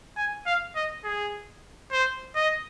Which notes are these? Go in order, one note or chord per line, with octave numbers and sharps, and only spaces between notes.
G#5
F5
D#5
G#4
C5
D#5